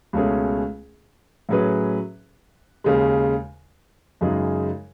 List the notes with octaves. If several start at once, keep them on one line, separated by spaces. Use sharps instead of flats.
C#2 B2 A3 C#4 G#4
A2 F#3 C#4 G#4 B4
D#2 C#3 G#3
F#2 C#3 G#3 D#4 G#4